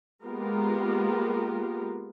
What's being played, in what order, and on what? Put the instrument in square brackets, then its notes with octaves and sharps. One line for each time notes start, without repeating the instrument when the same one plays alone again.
[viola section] G#3 A#3 B3 F4 G4 A#4